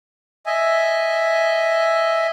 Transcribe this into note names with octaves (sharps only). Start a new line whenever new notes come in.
D#5 E5 G#5